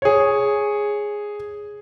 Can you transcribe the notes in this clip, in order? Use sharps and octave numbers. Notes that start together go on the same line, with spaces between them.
G#4 C#5